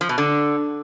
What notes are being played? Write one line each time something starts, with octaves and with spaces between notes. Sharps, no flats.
F3
B2
D3